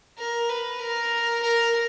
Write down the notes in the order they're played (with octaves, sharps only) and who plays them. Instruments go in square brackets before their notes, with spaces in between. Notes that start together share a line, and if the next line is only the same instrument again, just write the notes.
[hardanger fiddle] A#4
B4
A#4
A#4